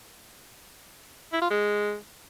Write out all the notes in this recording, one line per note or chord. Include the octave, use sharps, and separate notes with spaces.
E4
F4
G#3